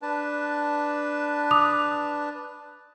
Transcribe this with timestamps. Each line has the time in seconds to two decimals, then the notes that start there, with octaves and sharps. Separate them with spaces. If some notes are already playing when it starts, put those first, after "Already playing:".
0.02 D4 B4 A5
1.51 D6 D#6 F7